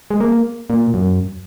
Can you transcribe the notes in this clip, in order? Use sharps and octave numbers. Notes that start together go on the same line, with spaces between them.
G#3
A#3
A#2
F#2